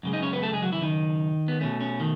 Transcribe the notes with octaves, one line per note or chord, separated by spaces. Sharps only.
F#2 C#3 G#3
D#4 D#5
C#4 C#5
B3 B4
A3 A4
G#3 G#4
F#3 F#4
E3 E4
D#3 D#4
B3
B2 A3 C#4
C#4
D#3